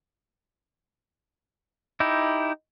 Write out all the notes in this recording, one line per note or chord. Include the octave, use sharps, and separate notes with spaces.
D#4 E4 G4